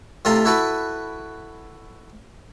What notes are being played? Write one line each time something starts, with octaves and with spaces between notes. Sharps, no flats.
A2 C3 F4 A4 A#5 C6
E4 F#4 A4 B4